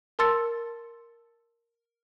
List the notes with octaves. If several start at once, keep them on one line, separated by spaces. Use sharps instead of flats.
A#4 A5 C6 E6 A6 C#7